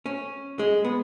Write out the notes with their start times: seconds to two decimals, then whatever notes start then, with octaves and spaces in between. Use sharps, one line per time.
0.06 C#4
0.59 G#3
0.85 B3